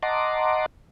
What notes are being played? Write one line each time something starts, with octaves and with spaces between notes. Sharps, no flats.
D#5 F#5 A5 A#5 C6 D6